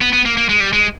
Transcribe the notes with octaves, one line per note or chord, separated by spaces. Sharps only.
B3
B3
A#3
A#3
G#3
G3
G#3